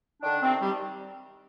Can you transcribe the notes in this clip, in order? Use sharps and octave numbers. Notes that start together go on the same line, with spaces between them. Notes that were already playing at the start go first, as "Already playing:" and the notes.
D3 D#3 D4
C3 D#3 C4
G3 G4